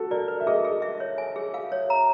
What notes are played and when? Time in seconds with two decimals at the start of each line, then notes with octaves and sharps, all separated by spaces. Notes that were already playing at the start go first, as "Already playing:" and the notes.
Already playing: F#4 A4
0.11 A#4 D5
0.28 B4
0.40 E5
0.47 G#4 D#5
0.65 G#4
0.82 E5
1.00 C#5
1.18 G#5
1.36 G#4
1.54 F5
1.72 C#5
1.90 A#5